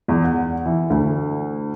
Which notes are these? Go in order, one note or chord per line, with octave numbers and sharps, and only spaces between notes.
E2
F#5
E3
D2